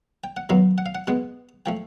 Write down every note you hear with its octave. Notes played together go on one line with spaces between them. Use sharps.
G5
F#5
F#2 D#3 F#3 B3 F5
F#5
F5
F#5
B2 G#3 B3 F#5
F3 A3 G5